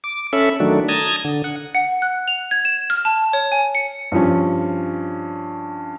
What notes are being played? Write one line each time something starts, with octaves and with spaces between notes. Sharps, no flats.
D6
C#4 A4 E5 B5
D#3 F#3 A3 D4
A5 A#5 D#6 G#6
D3
F#5
F#5
F#6
F7
G#6
E7
F6
A5
C#5
G#5
C#7
G2 F3 C#4